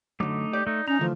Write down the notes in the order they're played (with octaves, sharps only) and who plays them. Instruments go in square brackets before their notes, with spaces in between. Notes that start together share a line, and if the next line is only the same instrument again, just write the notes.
[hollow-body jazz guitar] F#2 D3 [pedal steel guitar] A3 D#4 D6
[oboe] G4 [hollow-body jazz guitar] D5
[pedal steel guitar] A3 [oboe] D#4
[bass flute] C#4 [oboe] D#4 [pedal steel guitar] A#5
[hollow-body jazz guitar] D3 E3 A3 [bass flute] F3